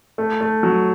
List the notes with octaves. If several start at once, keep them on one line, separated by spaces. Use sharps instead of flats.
A3
A3
F#3